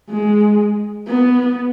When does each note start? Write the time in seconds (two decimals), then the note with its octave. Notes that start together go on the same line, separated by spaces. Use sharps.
0.10 G#3
1.07 B3